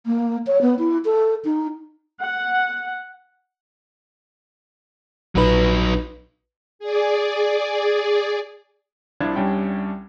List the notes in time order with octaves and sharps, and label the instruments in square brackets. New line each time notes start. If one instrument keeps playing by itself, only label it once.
[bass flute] A#3
C#5
B3
E4
A4
D#4
[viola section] F#5
[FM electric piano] A#1 B4 [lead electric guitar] F#3 D#4
[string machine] G#4 D5
[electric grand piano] C2 F3 D4 E4 F4 G#6
C2 G3 C#4 D4 G5